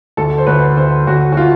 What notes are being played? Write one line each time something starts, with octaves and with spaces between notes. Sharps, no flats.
D2 A4
C5
D2 B4
D2 C5
D2 F#4
F#4
F4